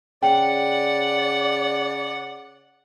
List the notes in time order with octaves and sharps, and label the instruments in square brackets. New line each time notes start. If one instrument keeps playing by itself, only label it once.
[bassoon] C#3 [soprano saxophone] D5 [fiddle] F#5 [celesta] G5